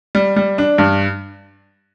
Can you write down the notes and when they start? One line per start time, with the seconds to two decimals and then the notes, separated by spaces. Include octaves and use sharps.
0.15 G3
0.36 G3
0.58 D4
0.78 G2